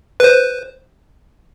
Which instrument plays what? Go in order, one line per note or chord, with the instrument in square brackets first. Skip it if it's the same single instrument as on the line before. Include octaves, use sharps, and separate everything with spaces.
[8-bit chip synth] B4 C5